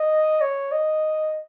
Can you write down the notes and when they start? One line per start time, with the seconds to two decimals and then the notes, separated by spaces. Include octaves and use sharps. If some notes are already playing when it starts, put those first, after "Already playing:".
Already playing: D#5
0.41 C#5
0.72 D#5